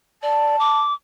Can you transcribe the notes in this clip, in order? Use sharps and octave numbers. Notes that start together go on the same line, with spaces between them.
D5 A5
D6